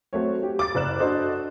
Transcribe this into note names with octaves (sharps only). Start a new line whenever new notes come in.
F#3 A3 C4 F#4 C#5
G4
D6 A6
F#1 D5 F#6 E7
D4 F#4 A4 C5 D5 D#5